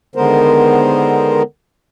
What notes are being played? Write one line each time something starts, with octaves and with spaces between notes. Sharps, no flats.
D3 D#3 G#3 B3 A#4 C5